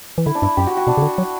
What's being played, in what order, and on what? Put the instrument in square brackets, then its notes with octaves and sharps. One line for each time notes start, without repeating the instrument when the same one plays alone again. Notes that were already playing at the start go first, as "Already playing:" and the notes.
[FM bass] E3
[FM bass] D3 [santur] E4
[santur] D4
[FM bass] G2 [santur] E4
[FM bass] F#2 [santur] G4
[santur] F#4
F#4
[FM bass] B2 [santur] D4
[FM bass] C#3
D3
F#3